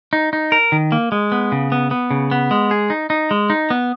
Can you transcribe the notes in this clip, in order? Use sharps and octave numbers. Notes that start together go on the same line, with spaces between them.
D#4
D#4
A#4
D#3
A#3
G#3
B3
C#3
B3
B3
C#3
B3
G#3
G#4
D#4
D#4
G#3
D#4
B3